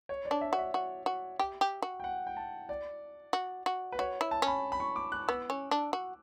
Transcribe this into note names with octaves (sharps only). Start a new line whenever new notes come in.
C#5
D5
D4
E5
F#4
E5
F#4
F#4
G4
G4
F#4
G5
F#5
G5
A5
D5
F#4
F#4
B4
F#4 C#5
E4
A5
C#4 B5
B5
C#6
D6
F#6
B3 E6
C#4
D4
F#4